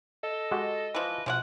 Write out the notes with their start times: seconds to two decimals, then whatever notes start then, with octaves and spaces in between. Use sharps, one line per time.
0.23 A4 D#5
0.51 G#3 F#4 G4
0.95 E3 F3 B4
1.26 B2 F3 G#3 C#5 F#5